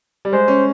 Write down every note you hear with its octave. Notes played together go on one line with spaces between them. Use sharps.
G3
G#3 C5
C#4